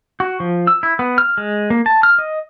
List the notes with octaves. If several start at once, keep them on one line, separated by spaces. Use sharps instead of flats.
F#4
F3
E6
E4
B3
F6
G#3
A#3
A5
F6
D#5